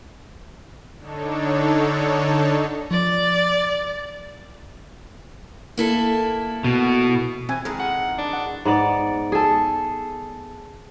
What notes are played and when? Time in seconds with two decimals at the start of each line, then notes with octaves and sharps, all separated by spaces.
0.98 D3 D4 D#4 A4 C#5
2.91 F3 D5
5.77 A#3 E4 A4
6.64 B2
7.49 E3 C4 G#5
7.65 D#3 E3 G#3 A4
7.79 F#5
8.18 D4
8.33 F#5
8.65 G#2 B3 D5
9.32 G#4 A4